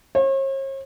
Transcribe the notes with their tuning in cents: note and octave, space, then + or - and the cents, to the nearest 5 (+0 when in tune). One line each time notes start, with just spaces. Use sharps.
C#5 -45